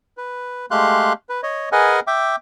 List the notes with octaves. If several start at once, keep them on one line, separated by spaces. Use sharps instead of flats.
B4
G#3 A3 G4 F5 C6 F#6
B4
C#5 D#5
G#4 A#4 B4 D#5 F#5 G#5
E5 G5 D6